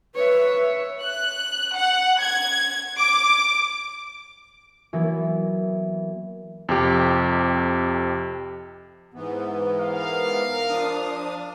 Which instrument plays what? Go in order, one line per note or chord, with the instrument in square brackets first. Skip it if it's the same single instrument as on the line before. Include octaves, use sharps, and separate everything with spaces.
[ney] B4 [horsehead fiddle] C#5 E5
[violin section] F#6
F#5
G#6
D6
[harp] E3 F#3 A#3 B3 E4
[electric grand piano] F2 C3 G4
[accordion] G#2 E3 B3
[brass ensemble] A#4 F5
[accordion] F3 D4 D#6